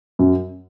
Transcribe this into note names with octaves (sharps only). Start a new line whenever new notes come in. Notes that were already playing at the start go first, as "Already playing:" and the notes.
F#2